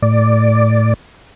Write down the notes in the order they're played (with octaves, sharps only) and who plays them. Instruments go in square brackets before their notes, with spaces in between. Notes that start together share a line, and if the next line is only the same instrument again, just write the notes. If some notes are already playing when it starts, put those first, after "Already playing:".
[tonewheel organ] A2 D5